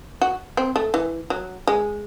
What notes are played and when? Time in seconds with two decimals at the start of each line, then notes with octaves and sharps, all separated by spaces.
0.22 F#4
0.57 C4
0.76 A3
0.94 E3
1.30 F#3
1.67 G#3